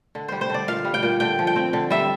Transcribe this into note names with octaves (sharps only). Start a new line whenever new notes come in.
D3
G3 C5
C5
D3 D5
A#2 F5
G3
G5
A#2
D3 G5
F3
G5
C4
D3
G3 E5